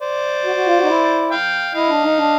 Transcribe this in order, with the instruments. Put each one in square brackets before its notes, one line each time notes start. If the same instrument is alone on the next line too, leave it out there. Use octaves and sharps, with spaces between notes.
[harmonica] C5 D5
[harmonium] F#4
F#4
F4
F#4
D#4
E4
[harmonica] F5 G5
[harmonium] E4 [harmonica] D#5 F5
[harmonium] D4
D#4
D4